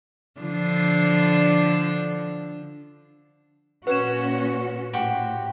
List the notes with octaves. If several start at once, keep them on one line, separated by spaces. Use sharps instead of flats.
D3 F3 D4
A#2 C#4 F#4 B4 C#5 F#5 E7
A2 F#4 G4 C5